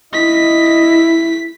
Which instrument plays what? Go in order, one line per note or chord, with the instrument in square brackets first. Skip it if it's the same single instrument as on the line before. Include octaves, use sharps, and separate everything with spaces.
[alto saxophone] E4 [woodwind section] D#5 [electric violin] B6